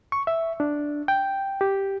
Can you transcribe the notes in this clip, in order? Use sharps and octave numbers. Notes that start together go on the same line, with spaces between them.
C#6
E5
D4
G5
G4